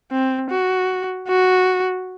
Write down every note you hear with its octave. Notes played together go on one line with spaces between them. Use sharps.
C4
F#4
F#4